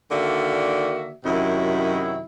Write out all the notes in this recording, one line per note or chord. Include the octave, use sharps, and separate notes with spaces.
D3 D#3 A#3 F#4 D5 E5
F#2 C3 D#3 F#3 E4